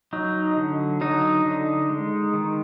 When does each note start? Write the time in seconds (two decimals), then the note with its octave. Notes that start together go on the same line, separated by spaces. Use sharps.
0.13 F#3 D#4
0.57 D3
1.01 F#3 D#4
1.45 D3
1.89 G#3
2.34 D#3